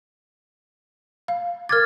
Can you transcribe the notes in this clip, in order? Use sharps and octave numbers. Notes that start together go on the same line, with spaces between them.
F5
A#4 D6 F6 G#6 A6